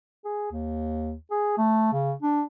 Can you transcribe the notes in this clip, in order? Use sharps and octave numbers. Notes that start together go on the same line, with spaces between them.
G#4
D#2
G#4
A3
C#3
D4